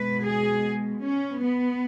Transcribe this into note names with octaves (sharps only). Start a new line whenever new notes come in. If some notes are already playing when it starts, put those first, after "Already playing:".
Already playing: B2 G#3 B4
G#4
C#4
B3